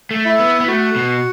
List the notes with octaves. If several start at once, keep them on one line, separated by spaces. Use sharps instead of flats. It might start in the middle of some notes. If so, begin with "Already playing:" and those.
A3
E4 E5
B3
B3
A3 F#4 F#5
B2